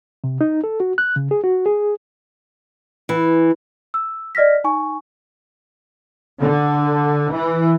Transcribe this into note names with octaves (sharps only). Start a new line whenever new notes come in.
C3
D#4
A4
F#4
F#6
C#3
G#4
F#4
G#4
E3
E6
D5 D#5 F6 A#6 B6
D#4 G#5 C#6
D3
E3